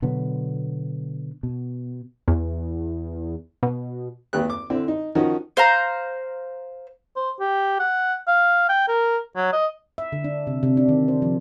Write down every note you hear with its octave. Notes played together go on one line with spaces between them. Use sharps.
B2 D3 F#3 B3
B2
E2
B2
G#1 D#2 G4 B4 F#6
D6
D3 C4 E4
D#4
D#3 F3 C#4 D#4 F#4
C5 F5 A#5
C5
G4
F#5
F5
G5
A#4
F#3
D#5
E5
D3
D4
C3
C3
D4
D#3
C5
F3